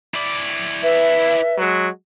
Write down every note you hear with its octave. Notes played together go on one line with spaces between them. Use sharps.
E4 D5
B4 E5
F#3 G#3 F#4